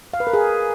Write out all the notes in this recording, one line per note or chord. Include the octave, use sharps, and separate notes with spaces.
F5
B4
A#4
G#4